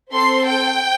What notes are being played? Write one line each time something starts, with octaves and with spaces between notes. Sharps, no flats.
C4 A4 C6
G5